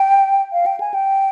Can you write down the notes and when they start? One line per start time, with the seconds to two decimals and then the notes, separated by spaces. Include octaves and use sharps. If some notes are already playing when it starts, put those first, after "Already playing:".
Already playing: G5
0.52 F5
0.66 G5
0.80 G#5
0.94 G5